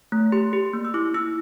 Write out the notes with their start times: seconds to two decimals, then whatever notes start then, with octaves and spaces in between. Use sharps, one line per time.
0.12 A3
0.32 G4 C6
0.53 G4
0.73 A#3
0.85 E6
0.94 E4 D6
1.14 E4 E6